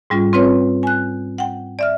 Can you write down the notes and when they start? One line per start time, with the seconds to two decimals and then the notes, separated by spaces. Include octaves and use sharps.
0.10 G#2 G3 C#4 F4
0.33 C4 F4 B4 C#5
0.83 G#5 F#6
1.38 F#5 G5
1.79 D5 E5 F6